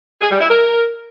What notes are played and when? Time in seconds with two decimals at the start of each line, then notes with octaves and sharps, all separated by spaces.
0.21 G#4
0.31 G3
0.40 E4
0.50 A#4